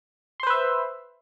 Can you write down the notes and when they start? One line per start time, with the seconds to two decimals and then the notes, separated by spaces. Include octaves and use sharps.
0.40 C6
0.43 C5
0.47 B4
0.50 E5